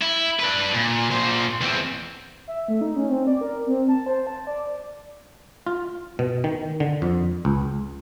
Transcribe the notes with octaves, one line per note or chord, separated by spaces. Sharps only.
E4
D4 B4
A#2
A#2 C5
E2 C4
E5
A3
D#4
C#4
C4
D5
A#4
C4
A5
C5
A5
D5
F4
B2
D#3
D3
F2
C#2